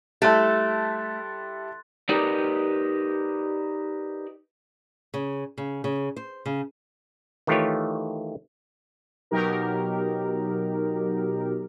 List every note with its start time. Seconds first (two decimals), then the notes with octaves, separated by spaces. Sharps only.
0.22 G3 A3 E4 A4 C6 F#6 A6
2.09 D#4 G4 A#4 B4 D5 D#5
5.14 C#3
5.58 C#3
5.84 C#3
6.16 C5
6.46 C#3
7.47 D#3 E3 A3 F4 G4 C#5
9.31 B2 F#3 D#4 G4 A#4